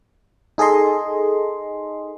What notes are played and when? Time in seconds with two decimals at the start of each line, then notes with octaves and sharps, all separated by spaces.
0.58 D#4 G#4 A4 D#5 C6